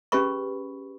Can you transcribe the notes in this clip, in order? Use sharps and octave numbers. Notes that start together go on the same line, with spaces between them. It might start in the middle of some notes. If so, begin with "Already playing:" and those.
C#4 G4 G#4 B4 B5 C#6